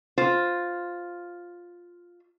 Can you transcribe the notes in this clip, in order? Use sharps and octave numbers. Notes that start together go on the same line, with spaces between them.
F4 C5